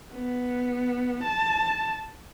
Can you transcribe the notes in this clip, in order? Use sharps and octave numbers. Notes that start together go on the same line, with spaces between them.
B3
A5